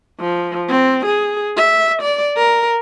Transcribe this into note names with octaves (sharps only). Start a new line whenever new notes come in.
F3
C4
G#4
E5
D5
A#4